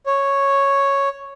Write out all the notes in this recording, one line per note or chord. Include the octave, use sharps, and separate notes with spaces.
C#5